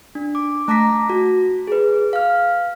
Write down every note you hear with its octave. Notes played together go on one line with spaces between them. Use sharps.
D4
D6
A3 A5 A#5 D6 A#6 B6
F#4
G#4 B4
F5 F6